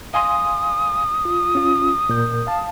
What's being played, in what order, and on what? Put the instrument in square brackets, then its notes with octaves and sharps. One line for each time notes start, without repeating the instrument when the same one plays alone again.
[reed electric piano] F5 G#5 C6 [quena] D#6
[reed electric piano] F4
C#4 F4
A#2 A#4 G6
F5 A5